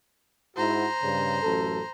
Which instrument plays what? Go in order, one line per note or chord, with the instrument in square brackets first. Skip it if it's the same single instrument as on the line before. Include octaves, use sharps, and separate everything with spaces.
[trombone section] G#2 E4 F#4 [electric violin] C5 A#5
[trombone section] G2 C#3
A1 F#2 A4